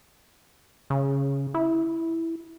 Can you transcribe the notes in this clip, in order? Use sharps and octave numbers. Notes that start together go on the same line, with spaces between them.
C#3
E4